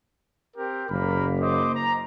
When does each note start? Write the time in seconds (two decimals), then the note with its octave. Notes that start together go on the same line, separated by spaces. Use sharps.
0.57 C4 G4 A#4
0.90 F#1 A#3 A#4 B5
1.40 C5 D#5 D6
1.75 A#5